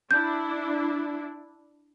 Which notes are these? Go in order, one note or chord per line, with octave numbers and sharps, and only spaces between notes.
D4 E4 G6